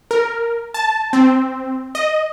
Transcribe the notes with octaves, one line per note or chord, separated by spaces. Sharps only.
A#4
A5
C4
D#5